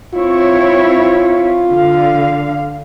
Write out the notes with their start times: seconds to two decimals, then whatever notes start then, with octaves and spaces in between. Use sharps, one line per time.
0.14 C4 E4 F4 C#5
1.70 D3 F5